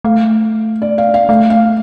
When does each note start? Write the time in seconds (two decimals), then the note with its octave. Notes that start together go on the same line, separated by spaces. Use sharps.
0.05 A3 F5
0.82 D5
0.98 F5
1.14 F5
1.29 A3 F5
1.50 F5